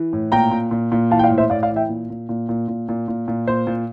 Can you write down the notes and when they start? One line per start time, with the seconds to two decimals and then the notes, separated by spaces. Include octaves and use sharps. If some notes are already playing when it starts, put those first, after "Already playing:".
Already playing: E3
0.13 A2
0.32 A#2 G5 A#5
0.51 A#2
0.71 A#2
0.92 A#2
1.10 E3 F5 A5
1.19 G5
1.24 D5 F5
1.30 A2
1.38 C5 E5
1.50 A2 D5 F5
1.63 D5 F5
1.71 E3
1.76 E5 G5
1.89 A#2
2.10 A#2
2.29 A#2
2.49 A#2
2.68 A#2
2.89 A#2
3.08 A#2
3.28 A#2
3.47 A#2 C5
3.67 A#2